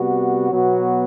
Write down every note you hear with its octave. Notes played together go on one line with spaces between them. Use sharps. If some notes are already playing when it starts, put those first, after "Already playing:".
Already playing: C3 G3 B3 F#4
B2 F#3 B3 F#4